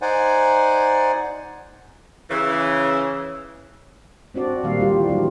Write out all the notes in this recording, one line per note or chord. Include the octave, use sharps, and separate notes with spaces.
D#4 C5 D5 F#5 G#5
C#3 E3
C4 D4 F#4 D5
A#2 D#3 G3 A#3 F5
G3 F4 G4
E3
F#3 G3 A#3 D4